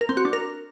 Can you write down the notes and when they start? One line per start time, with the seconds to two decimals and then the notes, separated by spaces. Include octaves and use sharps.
0.01 A#4
0.09 C4
0.17 F#4
0.25 D4
0.33 A#4